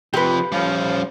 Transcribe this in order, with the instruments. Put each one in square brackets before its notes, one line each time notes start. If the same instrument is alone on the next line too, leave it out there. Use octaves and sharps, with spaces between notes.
[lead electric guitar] C3 F3 [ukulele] G4 B4
[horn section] F3 [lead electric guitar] G3 C#4